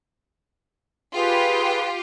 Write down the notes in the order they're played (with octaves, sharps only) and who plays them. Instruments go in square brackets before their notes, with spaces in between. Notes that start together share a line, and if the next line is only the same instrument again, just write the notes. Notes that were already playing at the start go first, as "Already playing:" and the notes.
[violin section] F4 G4 [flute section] G#4 B4 G5